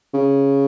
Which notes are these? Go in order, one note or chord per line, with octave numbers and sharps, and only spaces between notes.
C#3